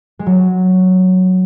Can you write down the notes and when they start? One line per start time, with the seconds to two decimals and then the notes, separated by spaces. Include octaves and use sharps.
0.19 G#3
0.26 F#3